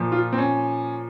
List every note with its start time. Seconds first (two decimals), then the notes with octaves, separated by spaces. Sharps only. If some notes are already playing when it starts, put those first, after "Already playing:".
Already playing: A#2 F3
0.12 F4
0.33 C4
0.38 C#4